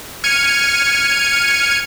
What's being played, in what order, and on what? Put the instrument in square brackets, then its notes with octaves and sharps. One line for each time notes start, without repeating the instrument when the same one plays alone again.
[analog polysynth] F6 G#6 C#7 D#7